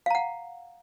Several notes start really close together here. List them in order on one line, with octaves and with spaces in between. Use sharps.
F5 A#5 F#5